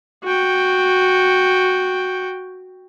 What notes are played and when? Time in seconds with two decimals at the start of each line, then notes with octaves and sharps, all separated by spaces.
0.24 F#4 G5